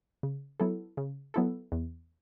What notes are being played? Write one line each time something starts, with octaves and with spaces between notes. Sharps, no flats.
C#3
F#3 B3 E4 A4
C#3
F#3 B3 E4 A4
E2